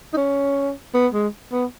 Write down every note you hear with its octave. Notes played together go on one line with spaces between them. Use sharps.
D#4
C#4
B3
G#3
B3